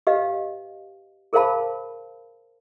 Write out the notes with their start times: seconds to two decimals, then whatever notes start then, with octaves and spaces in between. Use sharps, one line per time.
0.07 G4 B4 D#5 F5
1.33 G#4 A#4 C5 F5 A5 B5